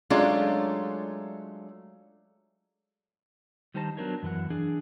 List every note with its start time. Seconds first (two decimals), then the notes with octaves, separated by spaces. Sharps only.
0.10 F#3 G#3 A3 C#4 D4 F4
3.74 D#3 G3 D#4 C5 A5 A#5
3.97 F#3 B3 D4 A#4 C5 C#5
4.23 F#2 E3 G4 F#5
4.50 E3 D4 G#4